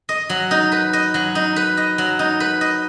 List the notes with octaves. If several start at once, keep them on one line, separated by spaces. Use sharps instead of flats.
D#5
F#3
D#4
B4
D#5
F#3
D#4
B4
D#5
F#3
D#4
B4
D#5